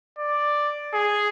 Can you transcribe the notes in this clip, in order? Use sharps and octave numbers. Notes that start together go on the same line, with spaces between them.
D5
G#4